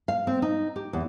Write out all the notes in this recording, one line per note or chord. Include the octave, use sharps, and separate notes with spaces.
F5
C4
D#4
G4
E2